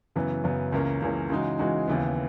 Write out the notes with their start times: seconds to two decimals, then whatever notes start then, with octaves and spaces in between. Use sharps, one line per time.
0.16 F#2 C#3 E3 B3
0.44 F#2 C#3 E3 B3
0.72 C#2 C#3 E3 A#3 C#4
1.02 C#2 C#3 E3 A#3 C#4
1.30 C#3 E3 G#3 D#4 F#4
1.59 C#3 E3 G#3 D#4 F#4
1.88 D#2 C#3 E3 B3